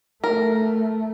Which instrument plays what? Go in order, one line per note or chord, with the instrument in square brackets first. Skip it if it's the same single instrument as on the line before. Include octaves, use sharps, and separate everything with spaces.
[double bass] A3 [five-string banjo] A#4